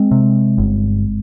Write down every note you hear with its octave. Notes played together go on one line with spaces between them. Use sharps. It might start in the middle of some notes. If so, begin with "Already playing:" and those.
Already playing: G#3 C4
C3
G1